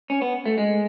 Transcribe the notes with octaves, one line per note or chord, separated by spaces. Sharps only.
C#4
B3
A3
G#3